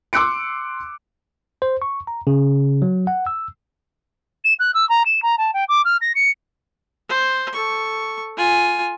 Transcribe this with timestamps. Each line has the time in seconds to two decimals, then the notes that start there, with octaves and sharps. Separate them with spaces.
0.13 C6 D6 E6 F#6 C#7 D7
1.62 C5
1.82 C#6
2.07 A#5
2.27 C#3
2.82 F#3
3.07 F#5
3.27 E6
4.44 E7
4.59 F#6
4.74 E6
4.89 A#5
5.06 E7
5.22 A#5
5.38 A5
5.54 G5
5.68 D6
5.85 F6
6.01 A#6
6.15 C#7
7.09 C5
7.53 A4 C#6
8.37 F4 G#5